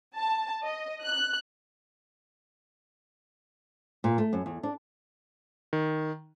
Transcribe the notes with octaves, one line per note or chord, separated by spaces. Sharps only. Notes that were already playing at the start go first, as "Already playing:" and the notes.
A5
D#5
F#6
A#2
A3
F#2
E2
D4
D#3